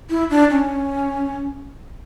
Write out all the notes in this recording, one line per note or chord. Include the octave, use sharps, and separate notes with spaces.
E4
D4
C#4